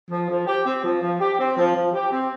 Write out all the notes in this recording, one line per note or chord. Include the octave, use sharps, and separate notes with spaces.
F3
F3
G4
C4
F3
F3
G4
C4
F3
F3
G4
C4